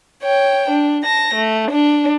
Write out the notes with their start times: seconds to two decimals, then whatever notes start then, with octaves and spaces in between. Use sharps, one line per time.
0.23 C#5 G5
0.70 D4
1.04 A5 A#6
1.34 A3
1.71 D4